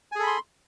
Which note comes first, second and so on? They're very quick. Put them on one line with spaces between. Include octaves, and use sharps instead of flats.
G#5 G#4 A4 B5 C6